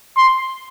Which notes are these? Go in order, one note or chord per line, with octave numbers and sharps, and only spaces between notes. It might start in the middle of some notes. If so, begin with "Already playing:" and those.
C6